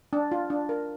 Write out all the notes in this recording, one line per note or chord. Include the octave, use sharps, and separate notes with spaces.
D4
F4
D4
A#4